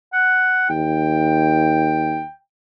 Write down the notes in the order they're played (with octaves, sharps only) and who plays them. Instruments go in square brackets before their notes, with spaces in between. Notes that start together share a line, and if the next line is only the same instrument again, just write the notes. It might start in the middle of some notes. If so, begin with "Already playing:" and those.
[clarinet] F#5
[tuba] D#2 [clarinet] G5